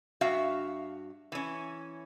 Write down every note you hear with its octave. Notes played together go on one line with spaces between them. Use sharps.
G2 F#4 E5 F5
E3 C#4